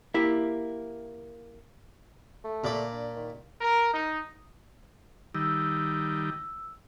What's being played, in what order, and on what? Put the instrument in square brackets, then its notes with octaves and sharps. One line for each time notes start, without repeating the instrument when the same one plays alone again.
[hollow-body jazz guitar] A#3 E4 G4 E5
[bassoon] A3
[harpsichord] A#2 D5 B5
[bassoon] D4
D#3
[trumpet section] A#4
D#4
[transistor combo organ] D#3 G3 [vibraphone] E6